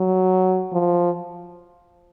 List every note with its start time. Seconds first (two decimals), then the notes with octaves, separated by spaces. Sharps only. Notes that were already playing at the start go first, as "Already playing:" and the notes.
Already playing: F#3
0.73 F3